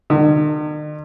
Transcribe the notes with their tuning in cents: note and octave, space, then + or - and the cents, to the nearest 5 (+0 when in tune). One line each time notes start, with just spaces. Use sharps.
D#3 -45